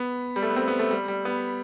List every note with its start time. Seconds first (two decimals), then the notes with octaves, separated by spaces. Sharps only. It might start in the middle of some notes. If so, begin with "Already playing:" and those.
Already playing: B3
0.36 G3
0.42 A3
0.50 B3
0.56 C4
0.68 B3
0.79 A3
0.91 G3
1.08 G3
1.25 B3